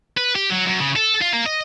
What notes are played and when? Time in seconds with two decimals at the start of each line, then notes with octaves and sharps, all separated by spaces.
0.18 B4
0.36 G4
0.50 F#3
0.66 F#2
0.81 C#3
0.96 A4
1.22 F4
1.33 A#3
1.46 D#5